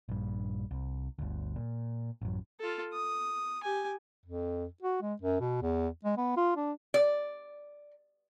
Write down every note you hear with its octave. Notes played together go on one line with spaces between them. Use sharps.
A#1 G2
C2
G1 D2
A#2
A1 F#2
F4 A4
D#6
G4 G#5
F2
F#4
G#3
F#2
B2
E2
G#3
B3
F4
D4
D5